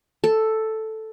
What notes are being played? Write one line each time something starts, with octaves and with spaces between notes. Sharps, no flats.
A4